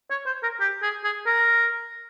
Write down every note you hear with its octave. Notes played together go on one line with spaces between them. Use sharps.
C#5
C5
A#4
G4
G#4
G#4
A#4